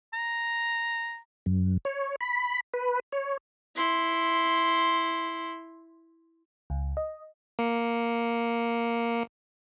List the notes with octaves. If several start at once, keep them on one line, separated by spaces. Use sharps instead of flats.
A#5
F#2
C#5
B5
B4
C#5
E4 C6
C#2
D#5
A#3 C#7